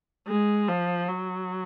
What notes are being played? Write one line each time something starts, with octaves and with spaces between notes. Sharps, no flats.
G#3
F3
F#3